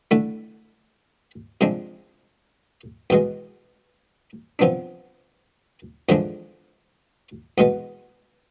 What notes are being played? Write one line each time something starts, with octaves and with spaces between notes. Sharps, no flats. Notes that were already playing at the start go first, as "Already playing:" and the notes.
D3 A3 E4
C3 F3 G#3 D4
E2 B2 G#3
C3 F3 B3 D4
E2 D3 F3 G#3 D4
E2 B2 G#3 B3